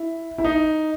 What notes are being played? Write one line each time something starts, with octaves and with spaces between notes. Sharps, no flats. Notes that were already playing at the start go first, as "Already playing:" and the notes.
Already playing: E4
E4
D#4